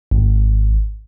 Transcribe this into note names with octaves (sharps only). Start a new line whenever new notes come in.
G#1